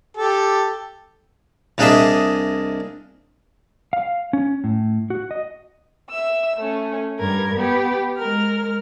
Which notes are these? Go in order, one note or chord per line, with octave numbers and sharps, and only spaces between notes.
G4 A4
C2 A#3 D4 G#4 D#5 E5
F5
C#4
A2
F#4
D#5
E5 E6
A3 C#4
G2 A#4 G#6
B3 G4
G#3 A#4 F6